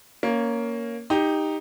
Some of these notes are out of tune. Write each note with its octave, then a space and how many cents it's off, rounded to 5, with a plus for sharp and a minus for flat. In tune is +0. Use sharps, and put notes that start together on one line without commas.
A#3 +0 C#4 +10
D#4 +0 G4 +15